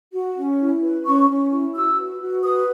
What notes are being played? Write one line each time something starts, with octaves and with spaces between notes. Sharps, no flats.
F#4
C#4
E4
B4
C#4 C#6
C#4
E4
F#4 E6
B4
F#4
B4 D#6